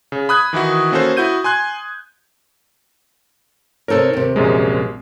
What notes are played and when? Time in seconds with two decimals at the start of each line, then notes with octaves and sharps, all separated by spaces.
0.12 C#3
0.29 B5 D#6 F#6 G#6
0.53 D#3 E3 E4 F#4
0.92 A#3 C#4 F#4 A4 C5
1.17 E4 F#4 G6 D#7
1.44 G#5 C6 F#6 G#6
3.88 C3 D#4 A4 A#4 C#5
4.13 D#2 C3
4.36 A#1 F#2 G#3